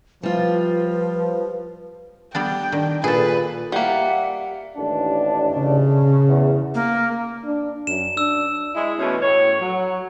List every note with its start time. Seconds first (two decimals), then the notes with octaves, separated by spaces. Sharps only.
0.23 F3 G3 F4 B4
2.35 G3 B3 D4 G5
2.72 D#3 D4
3.04 A#2 G#4 A4 B4
3.72 G3 A#3 E5 F#5
4.77 A1 D#2 D4
5.53 C#3
6.29 E2
6.74 A#3
7.45 D4
7.87 F#2 E7
8.17 D4 E6
8.74 G#3 E4
8.98 B2 E3 A3 C#4
9.22 A2 C#5
9.61 F#3